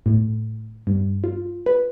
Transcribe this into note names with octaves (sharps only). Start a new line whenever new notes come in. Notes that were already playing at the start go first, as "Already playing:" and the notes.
A2
G2
F4
B4